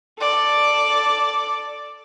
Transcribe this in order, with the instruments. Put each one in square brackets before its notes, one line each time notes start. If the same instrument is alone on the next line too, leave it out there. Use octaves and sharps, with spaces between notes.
[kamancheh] A4 D5